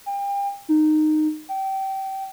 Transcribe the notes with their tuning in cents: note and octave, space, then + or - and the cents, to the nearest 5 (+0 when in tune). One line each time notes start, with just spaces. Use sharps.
G5 +35
D#4 -15
G5 -25